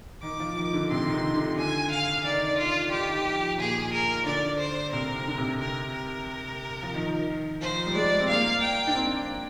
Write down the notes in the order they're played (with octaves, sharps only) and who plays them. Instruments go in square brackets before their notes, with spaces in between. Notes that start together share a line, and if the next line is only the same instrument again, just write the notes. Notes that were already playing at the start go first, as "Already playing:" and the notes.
[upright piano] D#3 [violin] D6
[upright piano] F3
D#3
D3
[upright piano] C3 [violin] C6
[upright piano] D#3
D3
D3
[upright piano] D3 [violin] G#5
[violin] F5
[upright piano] D#3 [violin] D5
[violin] F4
[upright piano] D#3 [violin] G4
[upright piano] F3
[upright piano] A#2 [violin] G#4
[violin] A#4
[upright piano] D3 [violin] D5
[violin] C5
[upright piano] C3 [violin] A#4
[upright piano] D3
C3
[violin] A#4
A#4
[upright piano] F3
D#3
[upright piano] F3 [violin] C5
[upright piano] G3
[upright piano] G#3 [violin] D5
[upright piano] C4
[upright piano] A#3 [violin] F5
[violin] G5
[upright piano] D4
C4